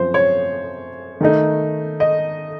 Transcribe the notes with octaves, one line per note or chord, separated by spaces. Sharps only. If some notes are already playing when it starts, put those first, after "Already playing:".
Already playing: F#2 F3 C4 F4 C5
C#5
D#3 A3 D#4
D#5